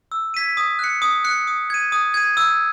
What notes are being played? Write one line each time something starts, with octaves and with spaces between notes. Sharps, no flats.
E6
G#6 B6 D#7
D#6
F#6 C#7
D#6
F#6 C#7
D#6
G#6 D#7
D#6
G#6 D#7
E6